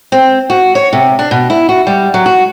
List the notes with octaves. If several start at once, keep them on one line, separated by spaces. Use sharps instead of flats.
C4
F#4
C#5
C3
D4
B2
E4
F#4
G3
F#3
F#4